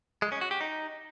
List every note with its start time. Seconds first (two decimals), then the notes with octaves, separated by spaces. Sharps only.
0.22 G#3
0.32 C#4
0.41 F#4
0.51 G4
0.61 D#4